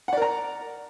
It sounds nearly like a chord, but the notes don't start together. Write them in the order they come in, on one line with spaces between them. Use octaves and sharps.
F#5 D5 A#4 A#5